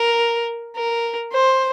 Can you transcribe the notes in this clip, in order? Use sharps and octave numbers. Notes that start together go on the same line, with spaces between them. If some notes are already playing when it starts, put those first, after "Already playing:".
Already playing: A#4
A#4
C5